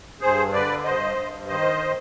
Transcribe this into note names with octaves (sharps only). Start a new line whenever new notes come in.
G2 G#4 C5
D3 B4 D5
G2 C5 D#5
G2
D#3 C5 D#5